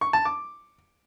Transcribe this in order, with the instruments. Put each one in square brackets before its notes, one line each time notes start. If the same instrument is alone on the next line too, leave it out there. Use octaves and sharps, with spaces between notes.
[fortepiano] C#6
A5
D6